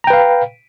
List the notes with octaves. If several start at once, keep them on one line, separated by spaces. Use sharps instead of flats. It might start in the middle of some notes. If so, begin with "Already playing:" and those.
B4 F5 G5 A#5